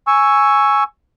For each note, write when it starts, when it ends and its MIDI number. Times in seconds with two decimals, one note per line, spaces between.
0.07 0.84 80
0.07 0.84 85
0.07 0.84 88